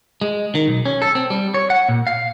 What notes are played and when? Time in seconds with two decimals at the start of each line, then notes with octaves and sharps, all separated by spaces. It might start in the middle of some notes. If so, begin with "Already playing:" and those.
0.21 G#3
0.55 D#3
0.67 B1
0.85 C#4
1.02 A4
1.15 C4
1.30 G3
1.54 C#5
1.70 F#5
1.89 A#2
2.07 F5